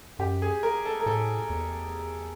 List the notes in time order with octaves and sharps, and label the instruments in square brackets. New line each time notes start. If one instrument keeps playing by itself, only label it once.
[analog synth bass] F#2 [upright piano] G4
[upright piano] G#4
A#4
A4
A#4
[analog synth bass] A2 [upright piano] A4
[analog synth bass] E2